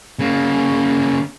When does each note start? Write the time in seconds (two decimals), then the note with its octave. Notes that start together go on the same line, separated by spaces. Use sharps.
0.19 C#3 A#3